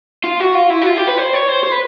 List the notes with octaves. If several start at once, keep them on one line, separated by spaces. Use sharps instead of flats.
F4
F#4
F4
E4
F#4
F4
G4
B4
C5
C#5
C5
C5
B4